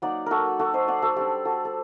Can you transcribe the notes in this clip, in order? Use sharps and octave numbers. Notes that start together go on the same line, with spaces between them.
F#3 A#3 D#4 D5 F#5
F#4 A4 A#4
F#4 A4
C5 D#5
D5 F#5
F#4 A4
G3 D4 G4
F#4 A4
A4